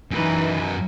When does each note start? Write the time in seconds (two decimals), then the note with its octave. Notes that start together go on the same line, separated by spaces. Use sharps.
0.11 F#2 E3 D#4 B4